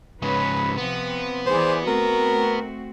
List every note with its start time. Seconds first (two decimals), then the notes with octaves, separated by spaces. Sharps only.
0.22 G#2 C#3 D#4 B4 C#5
0.77 C3 F3 B3 C4
1.47 E3 G#4 C5 D5
1.88 A3 C4 F#4 A#4